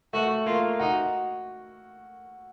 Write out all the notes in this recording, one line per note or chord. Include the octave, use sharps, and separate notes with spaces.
A3 F#4
A#3 F4
D#4 F#4